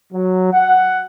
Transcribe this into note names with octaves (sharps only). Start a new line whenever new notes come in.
F#3
F#5